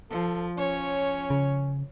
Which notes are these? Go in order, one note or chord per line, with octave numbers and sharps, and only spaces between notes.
F3 A4
F3 C#4 C#5
C#3